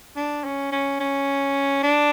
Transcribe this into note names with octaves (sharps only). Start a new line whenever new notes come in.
D4
C#4
C#4
C#4
D4